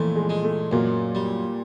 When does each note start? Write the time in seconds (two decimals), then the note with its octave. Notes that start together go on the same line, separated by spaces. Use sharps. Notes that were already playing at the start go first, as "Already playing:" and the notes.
Already playing: F2 A#2 E3 A3
0.16 G#3
0.29 G#3
0.44 A3
0.72 F#2 A#2 A#3
1.15 G3